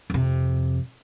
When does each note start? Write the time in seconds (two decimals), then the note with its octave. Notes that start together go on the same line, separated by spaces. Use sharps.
0.10 F2 C3